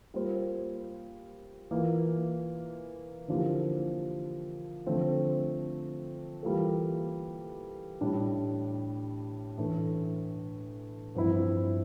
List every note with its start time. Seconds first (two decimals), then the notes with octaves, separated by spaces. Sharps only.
0.14 G3 A#3 F4 C5
1.71 E3 A#3 F4
3.28 D3 F3 A#3 E4 G4
4.86 D3 F3 A3 C4
6.43 E3 G3 A#3 F4 A4
8.01 A2 G3 D4
9.58 A2 E3 A3 D4
11.15 G2 F3 C4 E4